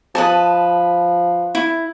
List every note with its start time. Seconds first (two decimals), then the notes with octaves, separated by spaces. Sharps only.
0.15 F3 B4 D#5 A5
1.55 E4